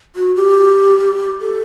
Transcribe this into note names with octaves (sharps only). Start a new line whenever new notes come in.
F#4
G4
A4